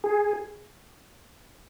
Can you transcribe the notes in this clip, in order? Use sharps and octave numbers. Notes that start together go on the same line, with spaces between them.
G#4